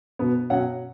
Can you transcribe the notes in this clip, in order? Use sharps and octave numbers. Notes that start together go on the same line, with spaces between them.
B2 B3
B2 F#3 C#4 F#5